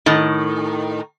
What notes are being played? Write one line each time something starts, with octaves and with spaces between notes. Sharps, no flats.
A2 D#3